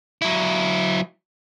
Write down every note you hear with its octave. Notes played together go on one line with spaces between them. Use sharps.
F#3 E4